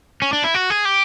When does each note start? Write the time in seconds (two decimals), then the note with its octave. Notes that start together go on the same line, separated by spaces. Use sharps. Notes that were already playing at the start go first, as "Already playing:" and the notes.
0.22 C#4
0.33 D4
0.44 E4
0.54 F#4
0.70 G#4
0.85 G4